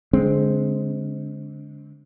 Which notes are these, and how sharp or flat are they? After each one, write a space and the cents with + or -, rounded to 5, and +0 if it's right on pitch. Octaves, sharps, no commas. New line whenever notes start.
D3 -25 G#3 +5 C4 +0